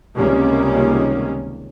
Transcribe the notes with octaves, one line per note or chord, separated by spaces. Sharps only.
C#2 C3 D#3 G3 A#3 C#4